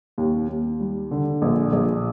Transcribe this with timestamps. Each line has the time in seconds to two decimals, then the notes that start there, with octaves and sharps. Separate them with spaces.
0.18 D#2
0.49 D#2
0.80 G3
1.11 D3
1.42 A#1
1.73 A#1